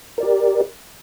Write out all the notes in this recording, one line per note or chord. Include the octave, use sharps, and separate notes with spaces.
G4 A#4 D5